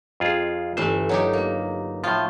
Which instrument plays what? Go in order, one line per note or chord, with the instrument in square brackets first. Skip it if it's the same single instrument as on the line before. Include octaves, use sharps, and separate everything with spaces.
[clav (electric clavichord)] F2 F4 G#4
[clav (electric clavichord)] G1 C5 [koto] E3 A3
[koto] F#3 D#4 G4
A#3
[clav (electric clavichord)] A2 F3 [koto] F4